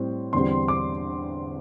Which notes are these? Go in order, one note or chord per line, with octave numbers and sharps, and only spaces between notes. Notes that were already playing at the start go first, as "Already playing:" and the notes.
Already playing: A2 G3 C4
E2 D3 G3 C4 C6
D6